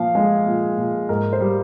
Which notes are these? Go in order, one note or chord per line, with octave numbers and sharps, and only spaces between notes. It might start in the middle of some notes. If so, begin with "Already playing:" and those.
Already playing: A#2 F3 F5
G#3 G#4
A#2
A#2
G#2 A#4
C5
G3